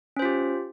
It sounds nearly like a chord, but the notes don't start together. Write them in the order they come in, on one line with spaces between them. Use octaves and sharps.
C#4 C5 F4 G4